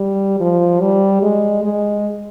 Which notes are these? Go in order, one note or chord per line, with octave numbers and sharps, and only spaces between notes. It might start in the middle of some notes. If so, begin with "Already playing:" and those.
Already playing: G3
F3
G3
G#3
G#3